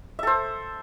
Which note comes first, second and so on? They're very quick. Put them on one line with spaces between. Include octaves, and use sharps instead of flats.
E5 A4 C5